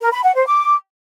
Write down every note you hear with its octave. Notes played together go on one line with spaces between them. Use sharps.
A#4
B5
F#5
C5
D6